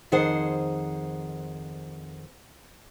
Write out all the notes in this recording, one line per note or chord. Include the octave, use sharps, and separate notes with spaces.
F2 D#3 G#4 C5 F#5